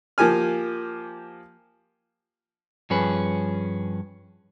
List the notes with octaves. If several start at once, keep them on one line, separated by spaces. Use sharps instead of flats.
F3 A#3 G4 G#5 F6
G2 F3 C#4 G#4 B4